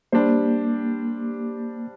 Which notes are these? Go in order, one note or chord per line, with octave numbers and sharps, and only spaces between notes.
G3 A#3 D4 G4 C5